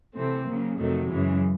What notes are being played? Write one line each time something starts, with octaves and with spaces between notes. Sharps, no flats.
C3 E3 A3 C4
C#3 F#3 A#3
F2 C3 D#3 F#3 A3
F#2 C#3 E3 G#3